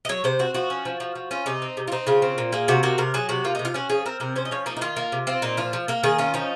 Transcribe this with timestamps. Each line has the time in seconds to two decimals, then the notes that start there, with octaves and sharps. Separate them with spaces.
0.05 D#5
0.09 F#3 C#5
0.24 C3 C5
0.39 C4 F#4
0.54 F3 F#4
0.70 C#4
0.85 F3
1.00 F3
1.15 F3
1.31 C#4 F4
1.46 C3 D#4
1.62 C4
1.77 C3
1.88 F4
1.92 C4 D#4
2.07 C#3 F4
2.22 C4
2.38 A#2
2.53 A#3 G#4
2.68 C3 F#4
2.83 A#3 F#4
2.98 C3 A#4
3.14 F#3 G#4
3.29 C3 F#4
3.44 A#3 F4
3.55 C3 D#4
3.65 F4
3.74 C#4 F#4
3.90 F3 G#4
4.06 C4 A#4
4.20 C3 A#4
4.36 C#4 C5
4.45 D#5
4.51 F3 C#5
4.66 A#3 D#4
4.77 D#4
4.81 D#3 F4
4.97 A#3
5.12 C3
5.27 C4 F4
5.42 A#2 D#4
5.57 F3 F4
5.73 F3
5.88 A#3 A#4
6.03 D#3 G#4
6.18 C#4 F4
6.34 F3 D#4